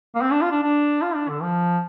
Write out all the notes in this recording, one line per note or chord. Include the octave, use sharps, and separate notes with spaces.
A#3
C4
D4
F4
D4
D4
F4
D4
D3
F3